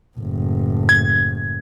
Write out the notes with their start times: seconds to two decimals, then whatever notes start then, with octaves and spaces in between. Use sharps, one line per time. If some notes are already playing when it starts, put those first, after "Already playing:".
0.17 F#1 A2
0.89 G#6